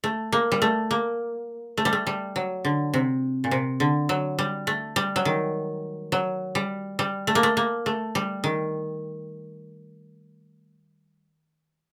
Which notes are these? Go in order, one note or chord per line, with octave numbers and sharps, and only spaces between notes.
A3
A#3
G3
A3
A#3
A3
G3
A3
G3
F#3
D3
C3
A#2
C3
D3
F#3
G3
A3
G3
F#3
D#3
F#3
G3
G3
A3
A#3
A3
A#3
A3
G3
D#3